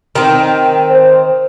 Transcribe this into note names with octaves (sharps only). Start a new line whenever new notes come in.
D#3 C4
C5